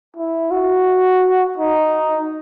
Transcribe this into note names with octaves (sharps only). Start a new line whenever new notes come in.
E4
F#4
D#4